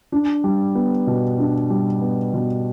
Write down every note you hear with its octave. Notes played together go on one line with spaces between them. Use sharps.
D4
G3
B3
B2
D4
G3
B3
B2